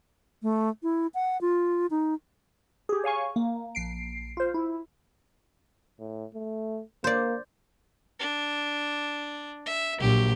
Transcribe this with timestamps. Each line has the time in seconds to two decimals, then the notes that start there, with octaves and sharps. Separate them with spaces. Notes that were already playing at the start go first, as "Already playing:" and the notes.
0.43 A3
0.83 E4
1.14 F#5
1.41 F4
1.91 D#4
2.89 G4 G#4
3.04 C#5 F5 G#5 C#6
3.36 A#3
3.75 A#1 C7 D7
4.37 F4 C5
4.54 E4
5.99 A2
6.34 A3
7.04 A#3 C5 D5
8.19 D4
9.66 E5
10.01 A#1 F#3 G4